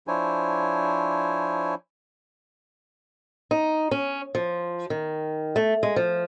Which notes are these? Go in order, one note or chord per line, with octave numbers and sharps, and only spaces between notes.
F3 D4 E4 C5 C#5 G#5
D#4
C#4
F3
D#3
A3
G#3
F3